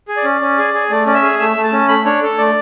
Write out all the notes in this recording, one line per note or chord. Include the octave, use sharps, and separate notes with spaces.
G#4
D5
C#4
C#4
G#4
G#4
A3 D5
C#4 D5
E5
G#4
A3 E5
A3
A5
C#4
A3 B5
D4 C#5
A4
A3 D5